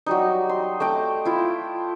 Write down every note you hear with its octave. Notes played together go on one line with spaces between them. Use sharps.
F#3 G3 D#4
C6
A3 D#5 G5 D6
E4 F4